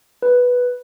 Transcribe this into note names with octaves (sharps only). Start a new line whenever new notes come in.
B4